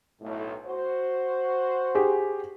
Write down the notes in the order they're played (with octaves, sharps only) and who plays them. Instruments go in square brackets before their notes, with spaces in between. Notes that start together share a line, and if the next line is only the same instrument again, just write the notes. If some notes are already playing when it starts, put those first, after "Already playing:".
[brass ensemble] B1 A2
F#4 C5
[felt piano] G4 G#4